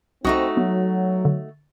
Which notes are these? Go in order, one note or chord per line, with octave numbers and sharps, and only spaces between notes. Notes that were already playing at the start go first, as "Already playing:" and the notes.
C2 A3 C4 D#4 F#4 D#6
F#3 B3
D3